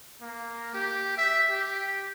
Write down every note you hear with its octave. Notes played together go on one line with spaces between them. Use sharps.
A#3
G4
E5
G4